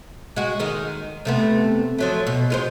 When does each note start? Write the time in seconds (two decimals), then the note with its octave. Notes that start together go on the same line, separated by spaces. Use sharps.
0.36 G#3 F#4
0.59 D#3 G#3 D#4
1.25 C3 A3 B3
1.98 F3 F#3 A3
2.27 B2
2.50 G#3 F4 C5